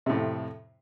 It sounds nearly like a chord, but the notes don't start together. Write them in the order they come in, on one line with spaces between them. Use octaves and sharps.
C3 A2 F2